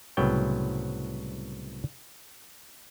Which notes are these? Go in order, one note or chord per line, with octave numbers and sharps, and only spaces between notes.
C2 A2 C#3 F#3 B3 G5